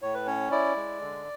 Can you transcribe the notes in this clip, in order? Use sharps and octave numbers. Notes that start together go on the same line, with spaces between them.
A2 C#5
B4
C#4 C#5
E4 D5
G#3
D3